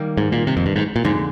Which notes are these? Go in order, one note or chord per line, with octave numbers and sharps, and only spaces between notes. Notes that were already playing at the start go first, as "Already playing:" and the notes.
Already playing: D#3 G3 A#3
G#2
A#2
C3
F2
G2
G#2
A#2
F2 G#2 D3 G#3 D#4